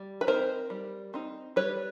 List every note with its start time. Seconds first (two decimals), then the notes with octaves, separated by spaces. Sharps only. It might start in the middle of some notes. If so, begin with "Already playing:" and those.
Already playing: G3
0.21 B4
0.27 C4 D#4 A#4 C5
0.70 G3
1.14 C4 D#4
1.56 G3 B4 C#5